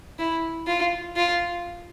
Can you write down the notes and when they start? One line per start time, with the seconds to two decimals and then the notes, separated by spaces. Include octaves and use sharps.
0.19 E4
0.67 F4
1.16 F4